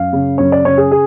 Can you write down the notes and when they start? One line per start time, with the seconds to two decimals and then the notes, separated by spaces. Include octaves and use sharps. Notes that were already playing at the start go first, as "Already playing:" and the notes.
Already playing: F#2 F5
0.13 C#3
0.38 F#2 C#5
0.52 D5
0.64 C#3 C#5
0.78 G#4
0.91 G#4